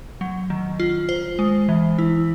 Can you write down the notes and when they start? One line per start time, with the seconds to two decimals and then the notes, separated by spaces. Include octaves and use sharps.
0.21 F#3
0.50 D#3
0.80 F4
1.09 C5
1.39 G#3
1.69 E3
1.98 E4